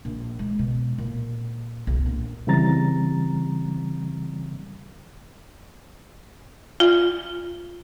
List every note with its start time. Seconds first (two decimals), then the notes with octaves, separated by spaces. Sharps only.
0.05 A#1
0.39 G#3
0.59 B2
0.98 A#2
1.87 B1
2.06 A#1
2.47 C#3 E3 G3 C4 A#5 A6
6.80 F4